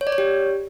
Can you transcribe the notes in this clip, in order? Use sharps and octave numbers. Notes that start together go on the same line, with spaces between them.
C#5
D5
C#5
G4